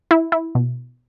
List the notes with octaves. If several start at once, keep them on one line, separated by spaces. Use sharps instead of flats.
E4
E4
B2